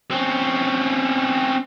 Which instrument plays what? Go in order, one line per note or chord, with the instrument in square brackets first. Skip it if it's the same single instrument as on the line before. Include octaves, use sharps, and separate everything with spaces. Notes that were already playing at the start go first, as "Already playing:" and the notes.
[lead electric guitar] C4 C#4